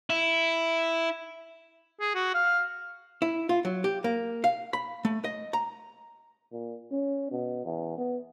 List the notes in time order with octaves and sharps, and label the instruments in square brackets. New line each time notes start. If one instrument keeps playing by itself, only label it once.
[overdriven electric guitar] E4
[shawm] G#4
F#4
F5
[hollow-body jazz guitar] E4
F4
F#3
G4
A#3
F5
B5
A3
D#5
A#5
[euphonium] A#2
C#4
B2
E2
B3